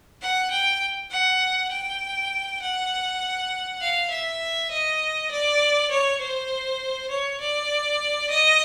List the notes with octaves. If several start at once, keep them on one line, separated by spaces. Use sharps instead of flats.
F#5
G5
F#5
G5
F#5
F5
E5
D#5
D5
C#5
C5
C#5
D5
D#5